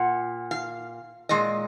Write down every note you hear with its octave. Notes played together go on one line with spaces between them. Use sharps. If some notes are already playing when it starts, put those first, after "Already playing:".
Already playing: A#2 F#5
F5
A#2 G#3 D#5